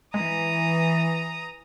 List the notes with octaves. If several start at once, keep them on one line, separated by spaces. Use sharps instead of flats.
E3 G#3 A#5 D#6